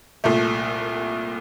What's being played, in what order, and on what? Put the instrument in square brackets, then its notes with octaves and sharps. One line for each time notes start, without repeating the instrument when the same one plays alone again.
[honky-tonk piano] C2 A#2 A3